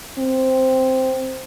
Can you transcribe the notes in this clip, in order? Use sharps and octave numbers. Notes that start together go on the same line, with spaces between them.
C4